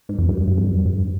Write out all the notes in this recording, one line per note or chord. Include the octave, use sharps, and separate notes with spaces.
G#2
F2
G2
G2
F2
G2
F2
G2